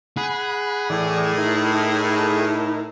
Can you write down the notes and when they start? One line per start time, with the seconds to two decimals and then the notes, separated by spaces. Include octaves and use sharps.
0.17 G#4 F#5 B5
0.90 A2 E3 D5
1.37 D#4 E4 A#4